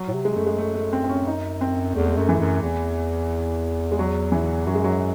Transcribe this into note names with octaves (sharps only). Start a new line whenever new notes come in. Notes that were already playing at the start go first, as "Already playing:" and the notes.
Already playing: F#3
A2
C3
G#3
F#2 A3
G#3
A3
A3
C4
C4
C#4
D#4
C4
E2 A3
G#3
F#2 A3
E3
F#2
E2
G#3
F#3
E3
F#2 F#3
G#3
F#3